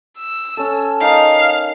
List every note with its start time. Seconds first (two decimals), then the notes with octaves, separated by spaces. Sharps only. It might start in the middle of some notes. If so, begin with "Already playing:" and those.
0.17 E6
0.57 C#4 A4
1.01 D#4 A#4 D#5 F5